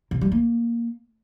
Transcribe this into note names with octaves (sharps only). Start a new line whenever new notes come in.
C3
G3
A#3